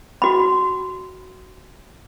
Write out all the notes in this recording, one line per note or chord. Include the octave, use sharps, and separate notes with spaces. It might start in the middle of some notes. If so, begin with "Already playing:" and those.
F#4 B5